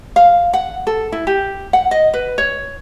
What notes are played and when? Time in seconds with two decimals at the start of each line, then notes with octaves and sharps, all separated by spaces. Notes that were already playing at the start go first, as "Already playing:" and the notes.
0.16 F5
0.53 F#5
0.87 A4
1.12 E4
1.27 G4
1.73 F#5
1.91 D#5
2.14 B4
2.38 C#5